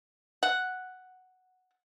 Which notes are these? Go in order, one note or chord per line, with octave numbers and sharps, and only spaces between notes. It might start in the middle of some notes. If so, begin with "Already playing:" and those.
F#5